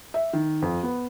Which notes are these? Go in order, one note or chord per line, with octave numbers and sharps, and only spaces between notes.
E5
D#3
F2
B3